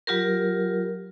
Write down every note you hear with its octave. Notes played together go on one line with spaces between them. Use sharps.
F#3 F4 G4 A#4